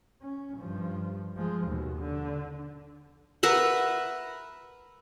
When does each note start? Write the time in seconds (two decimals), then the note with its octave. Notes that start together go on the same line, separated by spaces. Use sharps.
0.21 C#4
0.57 G2 F3
1.36 F3 G#3
1.66 D#2 B2
1.99 D3
3.43 A#4 B4 E5 F#5